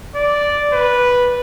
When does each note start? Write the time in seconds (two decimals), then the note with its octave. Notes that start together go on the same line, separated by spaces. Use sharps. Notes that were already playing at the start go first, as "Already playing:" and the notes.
0.15 D5
0.73 B4